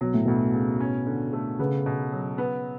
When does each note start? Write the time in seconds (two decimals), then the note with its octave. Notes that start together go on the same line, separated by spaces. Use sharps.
0.01 B2 F#3
0.14 A2
0.26 D2 B2
0.53 C#3
0.80 C#4
1.07 D3
1.33 A3
1.59 C#3 B3
1.86 B2
2.12 F#3
2.38 B3